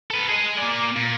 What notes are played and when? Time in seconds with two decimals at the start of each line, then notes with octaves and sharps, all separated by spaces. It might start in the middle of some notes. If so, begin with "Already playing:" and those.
0.10 A4 B4
0.28 G#4 D#5
0.58 A#3 D5
0.96 A#2